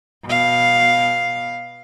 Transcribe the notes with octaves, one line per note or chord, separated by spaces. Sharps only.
B2 F5